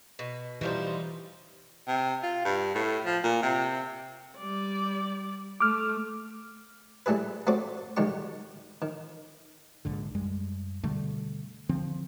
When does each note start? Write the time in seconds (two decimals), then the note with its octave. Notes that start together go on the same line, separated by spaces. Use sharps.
0.19 B2
0.61 B2 E3 F3 G3 D#4 C5
1.87 C3
2.23 F4
2.45 G2
2.75 A2
3.05 F3
3.23 A#2
3.42 C3
4.38 G3 D5
5.60 A3 D6 F6
7.06 G3 A3 E4 G#4 B4
7.47 A3 C4 F#4 D5 D6
7.97 B1 D#3 G3 G#3 G4 C#6
8.82 D#3
9.85 A#1 G#2 D3
10.15 F#2 G3 G#3
10.83 B2 D3 G3 A3
11.69 D3 F3 C4